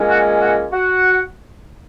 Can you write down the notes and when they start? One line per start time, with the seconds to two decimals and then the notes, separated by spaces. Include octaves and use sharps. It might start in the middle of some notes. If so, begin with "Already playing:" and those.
Already playing: A#2 G#3 C#4
0.09 F#4 F#5
0.41 F#4 F#5
0.72 F#4 F#5